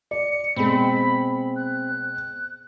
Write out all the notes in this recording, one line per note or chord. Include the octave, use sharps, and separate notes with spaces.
D5 C#7
B2 G#3 C4 B5
F#6